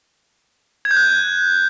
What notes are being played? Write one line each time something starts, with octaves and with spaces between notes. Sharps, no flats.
G#6
G6
F#6